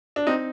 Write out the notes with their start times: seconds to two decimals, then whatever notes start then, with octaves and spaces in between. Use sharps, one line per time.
0.16 D4
0.27 C4 D#4